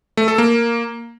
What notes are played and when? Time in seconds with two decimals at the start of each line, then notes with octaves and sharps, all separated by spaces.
0.17 A3
0.28 A4
0.38 A#3